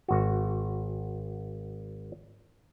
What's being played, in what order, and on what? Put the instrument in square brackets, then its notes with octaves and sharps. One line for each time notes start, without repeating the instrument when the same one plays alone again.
[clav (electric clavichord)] G#1 F#4